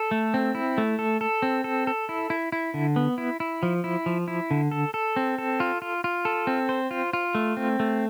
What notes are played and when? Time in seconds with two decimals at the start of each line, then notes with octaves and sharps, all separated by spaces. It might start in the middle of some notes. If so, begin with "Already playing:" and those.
Already playing: A4
0.11 A3
0.34 C4
0.55 E4
0.78 A3
0.99 A4
1.21 A4
1.42 C4
1.64 A4
1.87 A4
2.09 E4
2.30 E4
2.52 E4
2.74 D3
2.96 B3
3.18 E4
3.40 E4
3.63 F3
3.84 E4
4.06 F3
4.28 E4
4.51 D3
4.71 A4
4.94 A4
5.16 C4
5.38 A4
5.60 F4
5.82 F4
6.04 F4
6.25 A4
6.47 C4
6.69 C5
6.91 F4
7.13 F4
7.35 A3
7.57 C4
7.80 A3